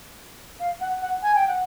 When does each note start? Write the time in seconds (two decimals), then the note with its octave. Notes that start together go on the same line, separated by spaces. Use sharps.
0.60 F5
0.81 F#5
1.02 F#5
1.23 G#5
1.35 G5
1.48 F#5